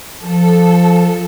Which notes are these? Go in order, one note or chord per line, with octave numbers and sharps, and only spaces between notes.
F3 A4